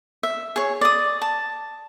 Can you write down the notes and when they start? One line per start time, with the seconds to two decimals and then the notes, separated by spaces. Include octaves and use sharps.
0.23 E5
0.56 G#4 C#5
0.81 D5 D#6
1.22 A5